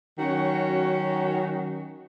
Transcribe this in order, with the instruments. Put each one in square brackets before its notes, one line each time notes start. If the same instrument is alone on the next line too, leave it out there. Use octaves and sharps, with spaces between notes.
[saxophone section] D#3 F#3 C#4 F#4